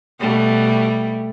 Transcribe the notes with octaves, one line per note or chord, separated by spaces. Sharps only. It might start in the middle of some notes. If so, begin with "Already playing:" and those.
B2 G3 A3